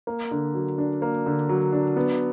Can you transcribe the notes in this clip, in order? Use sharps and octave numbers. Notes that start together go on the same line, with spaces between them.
A#3
D3
F#3
D4
A#3
D3
F#3
D4
B3